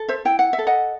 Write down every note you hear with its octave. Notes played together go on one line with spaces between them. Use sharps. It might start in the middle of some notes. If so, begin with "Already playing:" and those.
Already playing: A4
C5 E5
E4 G5
F#5
E5
A4
D#5 F#5